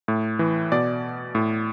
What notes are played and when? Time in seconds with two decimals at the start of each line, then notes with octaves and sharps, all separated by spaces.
0.08 A2
0.39 E3
0.72 B2 D5
1.35 A2